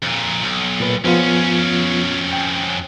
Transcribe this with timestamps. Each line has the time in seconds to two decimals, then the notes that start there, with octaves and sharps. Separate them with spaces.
0.03 F2 A#2
0.43 B1
0.80 A#2 B4
1.04 F2 F3 B3 C#4 F4
2.33 G5